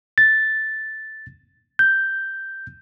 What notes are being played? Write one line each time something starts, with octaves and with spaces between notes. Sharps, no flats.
A6
G6